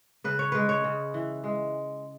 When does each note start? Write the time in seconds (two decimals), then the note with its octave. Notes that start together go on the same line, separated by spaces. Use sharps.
0.24 C#3 B4
0.39 C#5
0.52 G#3 B4
0.69 C#5
0.84 C#3
1.14 E3
1.44 G#3